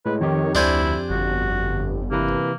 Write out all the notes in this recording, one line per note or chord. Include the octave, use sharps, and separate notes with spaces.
A2 G#3 B4
F2 D#3 G4 C#5
D2 D4 E4 C5 G#5
G1 F#4
C3 E3 A#3 B4